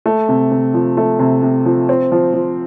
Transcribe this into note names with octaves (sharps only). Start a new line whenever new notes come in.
A3
C3
C3
F3
A3
C3
C3
F3
C4
F3
F3